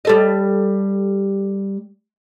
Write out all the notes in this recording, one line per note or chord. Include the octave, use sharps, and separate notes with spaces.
G3 A4 D#5